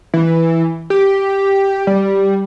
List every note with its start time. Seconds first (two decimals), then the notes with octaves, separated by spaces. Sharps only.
0.14 E3
0.90 G4
1.87 G3